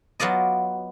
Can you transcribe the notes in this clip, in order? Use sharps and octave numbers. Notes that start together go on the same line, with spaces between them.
F#3 B3 F4 D5 D#5